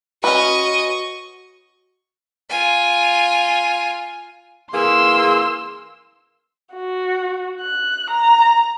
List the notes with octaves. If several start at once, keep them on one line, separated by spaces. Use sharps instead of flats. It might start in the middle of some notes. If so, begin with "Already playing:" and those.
C#4 F#4 B4 D#5 C#6
F4 G#5
E3 A#3 G#4 C6 E6
F#4
F#6
A#5